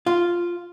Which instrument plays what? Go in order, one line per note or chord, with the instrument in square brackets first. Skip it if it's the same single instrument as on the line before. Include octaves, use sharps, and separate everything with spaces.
[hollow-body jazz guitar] F4